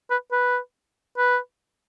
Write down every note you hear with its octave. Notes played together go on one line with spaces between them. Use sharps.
B4
B4
B4